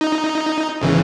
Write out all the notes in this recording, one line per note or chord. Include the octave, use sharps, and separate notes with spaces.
D#4
G#1 C#3 E3